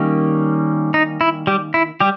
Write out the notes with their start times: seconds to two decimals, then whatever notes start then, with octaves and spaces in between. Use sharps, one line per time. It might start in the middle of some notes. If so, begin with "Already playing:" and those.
Already playing: D#3 G3 A#3 C#4
0.94 D#4
1.21 E4
1.47 G3 G4
1.74 E4
2.00 G3 G4